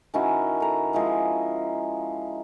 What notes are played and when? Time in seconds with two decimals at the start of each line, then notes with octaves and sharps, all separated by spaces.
0.14 D#3 C#4 E4 F#4
0.60 A4 A#5
0.93 F3 G#3 E4 D#5